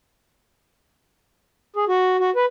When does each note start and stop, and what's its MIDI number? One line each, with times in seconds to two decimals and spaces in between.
1.76 1.85 68
1.89 2.17 66
2.20 2.30 66
2.36 2.45 71